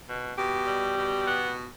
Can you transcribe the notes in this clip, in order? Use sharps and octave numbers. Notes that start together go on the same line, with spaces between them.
B2
B2 G4
G3
B2
B3